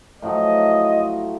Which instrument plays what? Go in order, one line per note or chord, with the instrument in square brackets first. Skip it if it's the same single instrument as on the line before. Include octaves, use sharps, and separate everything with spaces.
[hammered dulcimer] A2 F3 F#3 [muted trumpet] D#5